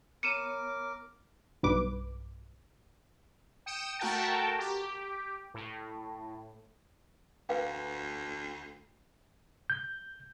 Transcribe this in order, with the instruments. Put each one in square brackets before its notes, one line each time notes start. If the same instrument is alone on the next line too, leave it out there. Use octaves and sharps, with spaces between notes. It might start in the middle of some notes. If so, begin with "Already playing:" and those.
[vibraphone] B3 C#5 [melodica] A#4 D6 [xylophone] C#7 D#7 E7
[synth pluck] B1 G2 B4 D6
[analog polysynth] G5 D#6 C#7 E7
A3 F#4 A#4 G5 A5
G4
A2
[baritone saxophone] D2 [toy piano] B4 F5 G5
[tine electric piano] G6